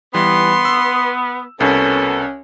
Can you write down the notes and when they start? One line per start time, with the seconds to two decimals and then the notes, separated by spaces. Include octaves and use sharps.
0.14 E3 G3 B3 C6
0.65 E6
1.60 C2 B2 C#4 A4 A#4